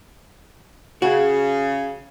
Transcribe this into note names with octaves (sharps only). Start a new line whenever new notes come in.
C#3 F#4